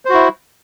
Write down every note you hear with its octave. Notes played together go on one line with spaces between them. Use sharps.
E4 F#4 C5